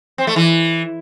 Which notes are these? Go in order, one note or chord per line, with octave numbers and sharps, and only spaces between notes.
C4
A3
E3